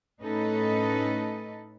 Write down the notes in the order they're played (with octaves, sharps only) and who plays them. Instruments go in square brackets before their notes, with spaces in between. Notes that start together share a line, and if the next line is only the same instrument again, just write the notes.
[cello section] A2 C#4 D#4 A4 B4 D#5